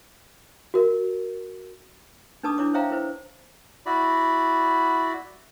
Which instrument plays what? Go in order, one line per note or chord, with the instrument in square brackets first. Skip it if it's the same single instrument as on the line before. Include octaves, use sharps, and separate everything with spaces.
[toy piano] F#4 A#4
D4 D#4 B4 A5 D6 D#6
D4 E4 C#5 D6
C5 C#5 E5 F5 G5 A#5
E4 B4 C5
[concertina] E4 F#4 D5 B5